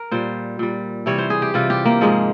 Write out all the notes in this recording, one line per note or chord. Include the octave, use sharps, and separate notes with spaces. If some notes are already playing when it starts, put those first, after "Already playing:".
Already playing: A#4
A#2 G3 C5
A#2 G3
C3 E3 G3 C#5
C5
G#4
G4
C3 E3 G3 F4
G4
A#3
G#2 F3 G#3